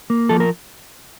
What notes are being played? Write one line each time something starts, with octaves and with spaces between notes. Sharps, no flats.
A#3
F3 A4
A#4